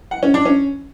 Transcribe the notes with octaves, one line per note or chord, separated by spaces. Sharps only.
F#5
C#4
D4
C#4